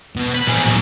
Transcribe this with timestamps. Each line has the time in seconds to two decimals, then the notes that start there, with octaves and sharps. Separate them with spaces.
0.16 B2
0.34 B4
0.48 A#2 G#4
0.65 A2 F#3